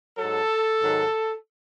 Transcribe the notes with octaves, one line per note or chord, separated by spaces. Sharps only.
G#2 F#3 A4
G#2 D#3 F#3